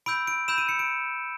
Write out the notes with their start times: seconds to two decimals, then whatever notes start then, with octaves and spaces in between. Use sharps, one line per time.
0.06 B5 E6 G6 D7
0.27 D7
0.48 B5 E6 G6 E7
0.58 D#7
0.69 C#7
0.79 D7